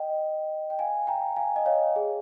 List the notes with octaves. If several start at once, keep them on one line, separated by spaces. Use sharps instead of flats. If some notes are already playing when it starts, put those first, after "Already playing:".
Already playing: D#5 G5
G5
F5 G#5
G5 A#5
F5 G#5
D#5
C#5 F5
G#4